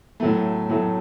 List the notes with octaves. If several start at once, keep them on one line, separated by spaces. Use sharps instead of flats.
A2 F#3 A3
A2 F#3 A3